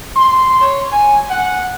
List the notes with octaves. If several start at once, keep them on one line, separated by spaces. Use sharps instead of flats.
C6
C#5
G#5
F#5